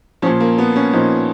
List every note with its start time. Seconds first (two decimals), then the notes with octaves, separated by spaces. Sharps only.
0.22 A#2 F3 C#4
0.40 A#3
0.58 B3
0.76 C#4
0.93 A#2 F3 D#4